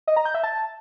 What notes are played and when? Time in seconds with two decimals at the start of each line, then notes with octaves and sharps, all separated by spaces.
0.07 D#5
0.16 A#5
0.25 G6
0.34 E5
0.43 A5